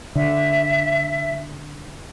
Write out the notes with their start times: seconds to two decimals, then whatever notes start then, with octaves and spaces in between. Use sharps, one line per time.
0.16 D3 E5